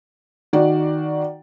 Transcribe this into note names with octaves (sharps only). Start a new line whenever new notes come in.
D#3 F#4 D5